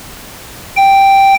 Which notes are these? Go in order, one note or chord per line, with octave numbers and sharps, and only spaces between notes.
G5